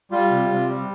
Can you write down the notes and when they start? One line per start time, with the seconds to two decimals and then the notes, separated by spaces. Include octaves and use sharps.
0.11 G3 F4
0.30 C3
0.49 C3
0.69 G3